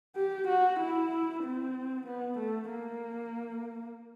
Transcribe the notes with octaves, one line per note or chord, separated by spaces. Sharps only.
G4
F#4
E4
C4
B3
A3
A#3